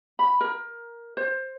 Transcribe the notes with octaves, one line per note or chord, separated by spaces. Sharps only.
B5
A#4
C5